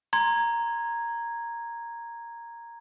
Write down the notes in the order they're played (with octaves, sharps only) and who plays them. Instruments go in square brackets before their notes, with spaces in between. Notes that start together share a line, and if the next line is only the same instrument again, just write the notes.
[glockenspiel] A#5 C6 G#6